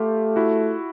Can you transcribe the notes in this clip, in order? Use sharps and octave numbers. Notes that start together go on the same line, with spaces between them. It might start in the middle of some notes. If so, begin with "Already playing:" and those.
Already playing: A3 F4 G4
E4 F#4